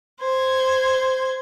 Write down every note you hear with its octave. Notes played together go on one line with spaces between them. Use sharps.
C5 G#6